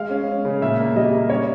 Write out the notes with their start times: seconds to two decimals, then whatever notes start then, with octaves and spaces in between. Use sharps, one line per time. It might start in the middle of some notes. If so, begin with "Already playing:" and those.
Already playing: G#3 F5
0.10 C#4
0.28 C#4
0.45 C#3
0.61 A#2 E5
0.79 A#3
0.96 G3 D#5
1.13 A#3
1.30 C#4 C#5